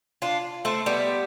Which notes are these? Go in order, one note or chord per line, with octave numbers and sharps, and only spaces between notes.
D4 F4
A3 C4
G3 B3